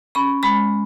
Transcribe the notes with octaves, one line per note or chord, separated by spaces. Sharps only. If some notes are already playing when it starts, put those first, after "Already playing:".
C#4 B5
G#3 B5